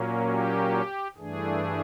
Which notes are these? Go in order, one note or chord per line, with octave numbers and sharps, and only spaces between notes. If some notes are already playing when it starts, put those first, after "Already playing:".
Already playing: A#2 F#3 A#3 C#4
G4
G2 E3 A3 D4 G#4